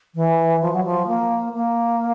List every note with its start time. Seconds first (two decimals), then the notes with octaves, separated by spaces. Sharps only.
0.15 E3
0.61 F3
0.73 F#3
0.84 F3
1.07 A#3
1.54 A#3